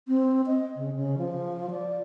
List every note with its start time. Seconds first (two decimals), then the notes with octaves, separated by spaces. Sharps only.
0.08 C4
0.46 D#5
0.76 C#3
0.96 C#3
1.18 F3
1.70 D5